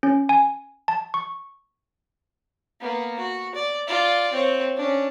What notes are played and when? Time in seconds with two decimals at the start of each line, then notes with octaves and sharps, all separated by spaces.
0.03 C#4
0.29 G#5
0.88 A5
1.14 C#6
2.81 A#3 B3
3.19 F#4
3.55 D5
3.87 F4 D5
4.33 C4 C#5
4.77 C#4 D4